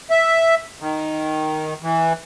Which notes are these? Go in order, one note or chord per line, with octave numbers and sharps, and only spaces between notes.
E5
D#3
E3